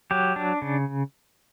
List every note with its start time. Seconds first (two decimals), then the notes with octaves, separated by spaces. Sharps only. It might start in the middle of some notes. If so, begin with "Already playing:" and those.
0.11 F#3 G4
0.36 D4
0.62 C#3